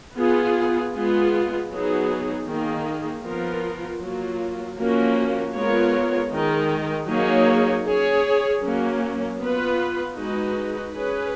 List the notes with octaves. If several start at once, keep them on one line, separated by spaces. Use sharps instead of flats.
B3 F4 G#4
G#3 B3 F4 G#4
F#3 B3 D#4 G#4
D#3 A#3 D#4 G#4
F3 B3 F4 A#4
F#3 A#3 F4
F3 A#3 C#4 F#4 A#4
G#3 B3 F4 A#4 C#5
D#3 G#3 D#4 A#4
F#3 A#3 D#4 G#4 C#5
C#4 G#4 C#5
F#3 A#3 C#4
B3 F4 B4
G#3 D#4 F#4 B4
C#4 G#4 B4